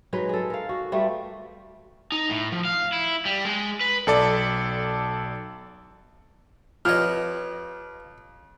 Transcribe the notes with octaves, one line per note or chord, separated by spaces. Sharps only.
F#3 G#3 D#4 B4
G#4 A4
A#4 F5
F#4
G3 A3 B3 F4
D#4
A2
F3
F5
E4
G3
G#3
B4
B1 A4 D5
F2 F4 G4 B4 C#5 D#5 F6